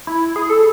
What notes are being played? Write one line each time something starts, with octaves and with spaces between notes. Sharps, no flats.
E4
G#4
A4